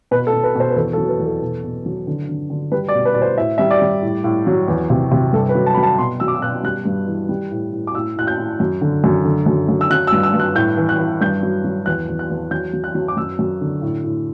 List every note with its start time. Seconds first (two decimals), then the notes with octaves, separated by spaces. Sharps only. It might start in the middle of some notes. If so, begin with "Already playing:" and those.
0.11 B2 B4
0.27 A4
0.33 B2
0.44 B4
0.55 B2 C5
0.70 B4
0.76 E2 A4
0.93 A4
0.98 F#3
1.08 B4
1.19 E2
1.26 A4
1.42 B2
1.64 B2
1.86 F#3
2.07 D3
2.29 D3
2.50 D3
2.72 G3 B4
2.88 D5
2.95 B2
3.06 B4
3.14 B2 D5
3.22 C5
3.37 A2 E5
3.58 G3 E5
3.71 D5
3.82 G3
4.02 A2
4.24 A2
4.47 F#3
4.68 E2
4.90 C3
5.11 C3
5.33 G2 A4
5.49 B4
5.55 F#3
5.66 A5
5.74 B5
5.78 F#3
5.83 A5
5.99 B2 C6
6.20 F#3 E6
6.28 D6
6.35 E6
6.42 B2 F#6
6.63 G3 F#6
6.85 G2
7.07 E3
7.29 G3
7.51 A2
7.73 A2
7.87 D6
7.95 A2 E6
8.16 A2 F#6
8.27 G6
8.38 A2
8.60 F#2
8.81 D3
9.04 F#2
9.25 D3
9.46 F#2
9.69 F#2
9.81 E6
9.90 F#3 F#6
10.07 E6
10.13 G2
10.23 E6
10.34 G2
10.39 F#6
10.55 A2 G6
10.78 E3
10.89 F#6
10.99 E3
11.21 G2 G6
11.43 F#3
11.64 F#3
11.86 E2 F#6
12.09 E2
12.19 F#6
12.30 E2
12.51 F#3 G6
12.73 F#3
12.84 F#6
12.95 F#3
13.08 D6
13.17 F#2 E6
13.39 F#2
13.61 D3
13.82 A2
14.04 A2